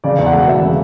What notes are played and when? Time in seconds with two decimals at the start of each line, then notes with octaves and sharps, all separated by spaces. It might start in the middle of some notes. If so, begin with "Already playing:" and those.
0.04 C#3 D5
0.18 E2
0.26 F#5
0.33 E1
0.48 E2 E5
0.62 C#3